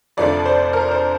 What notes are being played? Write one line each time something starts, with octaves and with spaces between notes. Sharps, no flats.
F1 F2 D3 F3 A3 D5
C5
A#4
C5